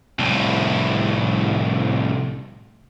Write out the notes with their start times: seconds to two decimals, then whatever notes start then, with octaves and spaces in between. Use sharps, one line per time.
0.19 C2 A2